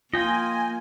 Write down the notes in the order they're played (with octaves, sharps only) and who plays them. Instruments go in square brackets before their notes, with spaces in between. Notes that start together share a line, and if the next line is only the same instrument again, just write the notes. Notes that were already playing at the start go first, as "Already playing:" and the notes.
[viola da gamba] A#3 [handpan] F4 [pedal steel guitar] D#5 G5 [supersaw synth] G#5